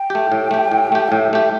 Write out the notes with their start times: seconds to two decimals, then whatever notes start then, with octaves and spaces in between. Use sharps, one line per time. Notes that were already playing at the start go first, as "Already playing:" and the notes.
Already playing: G5
0.10 A3 G4
0.32 A2
0.51 A3 G4
0.72 A2
0.92 A3 G4
1.12 A2 E5
1.33 A3 G4